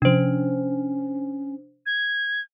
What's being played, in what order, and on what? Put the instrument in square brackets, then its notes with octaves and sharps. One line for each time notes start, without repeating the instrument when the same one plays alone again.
[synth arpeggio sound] C3 F3 [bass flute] C#4 [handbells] D4 C5
[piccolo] G#6